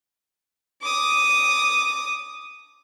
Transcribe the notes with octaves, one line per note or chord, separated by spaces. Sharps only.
D6 D#6